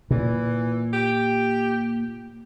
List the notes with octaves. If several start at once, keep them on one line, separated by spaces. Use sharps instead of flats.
A#2 E3
G4